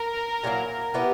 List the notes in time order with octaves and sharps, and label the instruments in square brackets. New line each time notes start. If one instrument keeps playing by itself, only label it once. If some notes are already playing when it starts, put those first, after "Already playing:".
Already playing: [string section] A#4
[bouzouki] A#2 F#3 A#3 E4
B3 E4 G4 B4